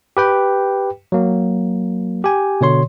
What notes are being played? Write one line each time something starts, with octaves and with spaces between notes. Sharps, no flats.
G4 B4 G5
F#3 A#3
G4 G#5
B2 D3 C#5 C6